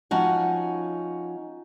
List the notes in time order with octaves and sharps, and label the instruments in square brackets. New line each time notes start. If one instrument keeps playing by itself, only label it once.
[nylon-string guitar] F3 C#4 D#4 F#4 F#5 G#5